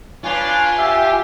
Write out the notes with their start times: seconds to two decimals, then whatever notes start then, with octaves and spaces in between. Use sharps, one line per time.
0.24 D4 F4 B4 C#5 G#5
0.78 G4 E5